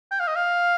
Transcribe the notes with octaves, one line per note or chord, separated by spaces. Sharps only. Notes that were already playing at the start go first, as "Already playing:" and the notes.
G5
F5
D#5
F5